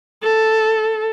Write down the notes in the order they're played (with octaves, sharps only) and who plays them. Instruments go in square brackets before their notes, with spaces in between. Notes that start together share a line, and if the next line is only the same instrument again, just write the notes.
[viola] A4